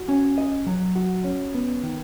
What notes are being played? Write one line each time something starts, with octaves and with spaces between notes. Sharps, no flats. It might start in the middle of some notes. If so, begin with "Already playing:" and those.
Already playing: F#4
C#4
D#5
F#3
F#4
C#4
B3
D#3